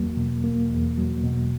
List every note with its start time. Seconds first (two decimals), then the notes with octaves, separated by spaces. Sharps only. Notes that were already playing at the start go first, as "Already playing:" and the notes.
Already playing: E2 F#3 A#3
0.17 B2
0.44 A#3
0.71 E2
0.97 F#3
1.24 B2